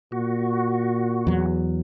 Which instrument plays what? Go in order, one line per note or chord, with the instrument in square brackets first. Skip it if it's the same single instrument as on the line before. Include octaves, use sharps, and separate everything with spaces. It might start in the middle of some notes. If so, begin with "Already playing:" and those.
[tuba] A#2 [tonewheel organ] F#4
[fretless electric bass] E2 F#3